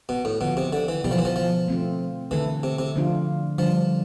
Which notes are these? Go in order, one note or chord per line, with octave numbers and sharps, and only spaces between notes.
B2
A2
B2 D3 F3 B3 F4
C3
D3
E3
B2 G3 B3 E4 A4
F3
E3
F3
F3
A3 C4 F4
D3 E3 A3 E4 A4
C3
C3
D3 F3 A3 D4 F4
D3 F3 G3 D4